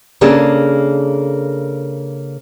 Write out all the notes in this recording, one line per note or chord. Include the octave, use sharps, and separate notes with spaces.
C#3 A#3 D4 G#4 A4